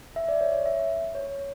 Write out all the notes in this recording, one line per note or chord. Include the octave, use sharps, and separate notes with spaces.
E5
D5
C#5
C#5
E5
C#5